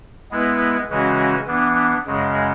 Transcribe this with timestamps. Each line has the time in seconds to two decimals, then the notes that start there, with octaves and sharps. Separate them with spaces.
0.31 G#3 B3 E4 B4
0.89 C#3 E3 G#3 C#4 F#4
1.47 E3 B3 D4
2.05 F#2 C#3 G#3